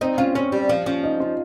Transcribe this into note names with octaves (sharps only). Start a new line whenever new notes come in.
C4 D#4
C#4 F4
C4 C#4
G3
F3
F3 C#4
D#4
F4